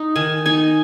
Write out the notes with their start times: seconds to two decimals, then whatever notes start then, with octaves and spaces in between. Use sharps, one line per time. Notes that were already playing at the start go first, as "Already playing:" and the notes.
Already playing: D#4
0.16 D#3 G#5
0.46 D#4 G#5